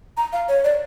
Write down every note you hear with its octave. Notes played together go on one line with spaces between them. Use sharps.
A#5
F5
C#5
D5